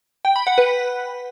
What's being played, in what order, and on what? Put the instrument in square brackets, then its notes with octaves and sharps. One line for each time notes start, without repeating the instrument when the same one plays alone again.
[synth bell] G5
B5
F#5
B4